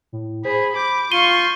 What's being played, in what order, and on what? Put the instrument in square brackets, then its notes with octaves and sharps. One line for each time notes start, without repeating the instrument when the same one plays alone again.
[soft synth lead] A2
[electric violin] G#4 [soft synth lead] C5 [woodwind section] B5
[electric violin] D6 [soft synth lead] G6
[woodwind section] F4 [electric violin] C6 C#6 [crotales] D#7 G7